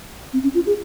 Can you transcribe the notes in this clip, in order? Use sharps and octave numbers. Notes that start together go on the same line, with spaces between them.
C4
C#4
F4
G#4